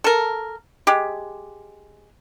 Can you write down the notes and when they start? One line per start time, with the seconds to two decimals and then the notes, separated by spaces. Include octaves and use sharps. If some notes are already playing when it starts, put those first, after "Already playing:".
0.04 A4 A#4
0.87 G#3 G4